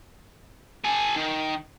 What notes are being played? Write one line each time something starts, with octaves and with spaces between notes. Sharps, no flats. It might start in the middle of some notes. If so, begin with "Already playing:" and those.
A4 G#5
D#3